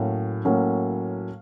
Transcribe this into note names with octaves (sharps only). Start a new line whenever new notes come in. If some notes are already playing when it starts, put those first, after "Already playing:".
Already playing: A2 F#3 A#3 C#4 F5
A2 F#3 A#3 C#4